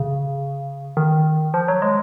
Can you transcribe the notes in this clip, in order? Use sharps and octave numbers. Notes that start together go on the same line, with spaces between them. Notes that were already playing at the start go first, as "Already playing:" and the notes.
Already playing: C#3
D#3
F3
F#3
G#3